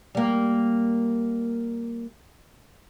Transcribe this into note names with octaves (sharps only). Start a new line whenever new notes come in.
G3 A#3